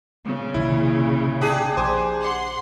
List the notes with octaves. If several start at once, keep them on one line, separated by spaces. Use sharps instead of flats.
A#2 C#3
A#1 C3 D#3 E4
D4 G4 G#4
A#1 C5 G#5 D6
F#5 C6